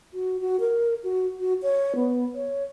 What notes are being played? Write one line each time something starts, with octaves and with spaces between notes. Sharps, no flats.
F#4
F#4
A#4
F#4
F#4
C#5
B3
C#5